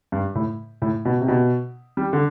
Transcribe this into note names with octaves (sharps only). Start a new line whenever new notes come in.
G2
A2
A2
B2
C3
B2
G3
D3